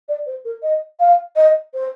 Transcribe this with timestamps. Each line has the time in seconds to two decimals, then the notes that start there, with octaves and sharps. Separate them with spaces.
0.08 D5
0.26 C5
0.45 A#4
0.63 D#5
1.00 F5
1.36 D#5
1.74 C5